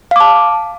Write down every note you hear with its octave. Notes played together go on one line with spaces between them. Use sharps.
F5 A5 D6